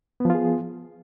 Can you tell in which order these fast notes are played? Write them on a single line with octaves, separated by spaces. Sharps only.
B3 F3 F4 G#4